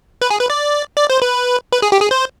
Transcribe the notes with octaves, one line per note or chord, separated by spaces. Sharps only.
B4
G#4
B4
D5
D5
C5
B4
B4
G#4
G4
G#4
C5